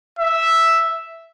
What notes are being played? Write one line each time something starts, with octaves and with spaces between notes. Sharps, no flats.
E5